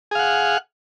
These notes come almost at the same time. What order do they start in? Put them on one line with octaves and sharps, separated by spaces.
G#4 F5 F#5